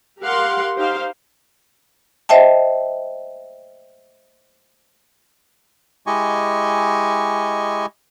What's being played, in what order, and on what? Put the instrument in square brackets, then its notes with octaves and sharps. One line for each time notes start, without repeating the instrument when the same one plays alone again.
[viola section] G4 A#4 F5 F#5 C6
D#4 G4 C5 F5
[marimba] C5 D#5 E5 G5 A5
[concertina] G#3 E4 G4 D#5 G#5 C#6